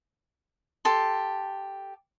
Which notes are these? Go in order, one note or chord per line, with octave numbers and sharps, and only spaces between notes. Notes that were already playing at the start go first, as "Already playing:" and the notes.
G4 A4 C6